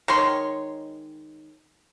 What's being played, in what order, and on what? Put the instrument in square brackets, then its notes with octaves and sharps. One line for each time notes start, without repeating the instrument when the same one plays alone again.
[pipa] D#3 G#3 C#5 C6